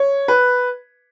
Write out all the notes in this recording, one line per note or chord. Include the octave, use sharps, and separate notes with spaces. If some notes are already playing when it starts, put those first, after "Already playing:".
Already playing: C#5
B4